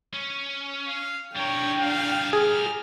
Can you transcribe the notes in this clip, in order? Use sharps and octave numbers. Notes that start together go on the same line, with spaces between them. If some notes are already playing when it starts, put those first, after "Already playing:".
C#4
F5
G3 D4 A#4 C#5 G5
F5
G#4 F6